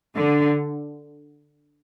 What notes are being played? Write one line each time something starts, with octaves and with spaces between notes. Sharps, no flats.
D3